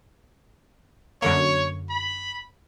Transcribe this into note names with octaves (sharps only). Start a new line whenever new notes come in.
F#2 D3 A#3 C#5
B5